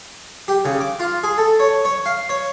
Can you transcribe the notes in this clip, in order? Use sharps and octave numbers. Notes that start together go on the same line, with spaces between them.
G4
C#3
D6
F4
G#4
A4
C#5
C#5
F5
C#5